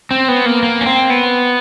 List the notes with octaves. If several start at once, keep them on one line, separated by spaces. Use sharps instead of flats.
C4
B3
A#3
A#3
C#4
C4
B3